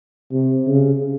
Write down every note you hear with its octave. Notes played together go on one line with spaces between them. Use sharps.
C3
C#3